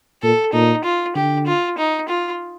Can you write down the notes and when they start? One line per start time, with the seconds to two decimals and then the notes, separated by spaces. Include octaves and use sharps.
0.23 A#2 A4
0.53 A#2 D#4
0.84 F4
1.15 D3 G4
1.47 F4
1.78 D#4
2.09 F4